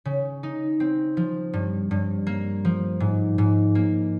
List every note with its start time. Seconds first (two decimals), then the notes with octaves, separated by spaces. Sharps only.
0.05 C#3
0.43 D#4
0.80 C4
1.17 F3
1.53 G2
1.91 G2
2.27 A#3
2.65 F3
3.00 G#2
3.38 G#2
3.75 A#3